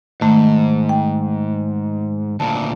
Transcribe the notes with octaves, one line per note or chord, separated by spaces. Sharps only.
G#2 D#3 A3
G5
D2 A#2 A5